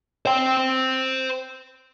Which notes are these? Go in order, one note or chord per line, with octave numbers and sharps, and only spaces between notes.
C5 G5